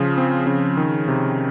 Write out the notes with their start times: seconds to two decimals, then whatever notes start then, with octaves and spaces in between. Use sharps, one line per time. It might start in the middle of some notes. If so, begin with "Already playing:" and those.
Already playing: C#3 F3
0.18 C4
0.47 C#3
0.77 D#3
1.08 C3